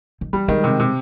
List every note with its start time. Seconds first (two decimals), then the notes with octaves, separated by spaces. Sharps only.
0.21 D#3
0.33 E3 G3
0.48 D#3 G#3
0.64 C3
0.79 C3